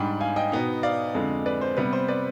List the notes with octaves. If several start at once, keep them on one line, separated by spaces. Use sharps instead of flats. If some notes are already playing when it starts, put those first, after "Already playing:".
Already playing: G#2 G3 D4 G5 B5
F5 G#5
D#5 G5
B2 B3 D#4
D5 F5
F2 D3 G#3
B4 D5
C5
C3 G3 B3 B4
C5
B4 D5